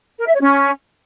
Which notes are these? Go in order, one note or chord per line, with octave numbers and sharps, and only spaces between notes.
A#4
E5
C#5
C#4